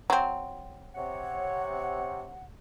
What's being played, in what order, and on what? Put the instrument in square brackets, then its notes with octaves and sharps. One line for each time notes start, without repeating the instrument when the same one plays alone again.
[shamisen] F#3 C4
[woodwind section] C3 C#5 F#5